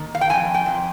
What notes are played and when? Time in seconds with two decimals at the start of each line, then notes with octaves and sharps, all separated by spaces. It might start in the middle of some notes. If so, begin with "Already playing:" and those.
Already playing: D#3 A#3
0.15 F5
0.21 G5
0.29 F2 G#5
0.54 G5
0.66 F2